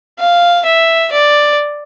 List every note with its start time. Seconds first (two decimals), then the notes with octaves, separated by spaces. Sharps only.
0.19 F5
0.65 E5
1.12 D5